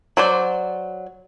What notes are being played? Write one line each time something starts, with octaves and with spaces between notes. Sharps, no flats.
F#3 C5 D5